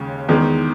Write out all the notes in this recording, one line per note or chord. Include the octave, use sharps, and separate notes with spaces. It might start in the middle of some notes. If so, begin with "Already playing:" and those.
Already playing: D#2 C#3 G#3
E2 D#3 G#3